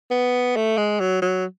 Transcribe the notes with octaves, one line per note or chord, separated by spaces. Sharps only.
B3
A3
G#3
F#3
F#3